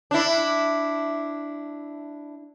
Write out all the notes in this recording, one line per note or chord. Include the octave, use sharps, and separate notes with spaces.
D4 E4